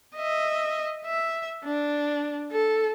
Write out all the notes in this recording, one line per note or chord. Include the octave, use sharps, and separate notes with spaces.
D#5 E5
E5
D4
A4